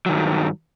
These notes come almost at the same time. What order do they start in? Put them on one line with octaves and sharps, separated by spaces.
F#3 D#3 G2